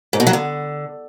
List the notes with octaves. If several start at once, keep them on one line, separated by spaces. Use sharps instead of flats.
G#2
B2
F#3
D3